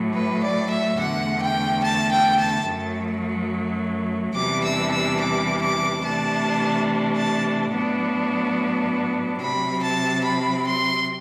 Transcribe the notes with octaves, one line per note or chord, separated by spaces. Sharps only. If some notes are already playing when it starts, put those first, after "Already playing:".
Already playing: A2 F#3 A3
B4
D5
E5
E2 D3 A3 F#5
G5
A5
G5
A5
F#2 F#3 A3
E2 C3 E3 G3 D4 D6
E6
E6
D6
D6
C3 E3 A3 D4 A5
A5
A2 F#3 B3 D4
C3 F#3 C4 B5
A5
B5
C6